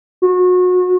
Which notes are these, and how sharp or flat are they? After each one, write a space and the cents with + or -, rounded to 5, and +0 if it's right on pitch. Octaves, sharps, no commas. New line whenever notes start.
F#4 -30